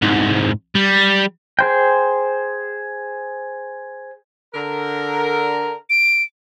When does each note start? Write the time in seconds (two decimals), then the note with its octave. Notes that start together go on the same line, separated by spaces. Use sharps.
0.02 C2 G#2
0.75 G3
1.59 G#4 C5 G5
4.54 D3 A#4
5.90 D7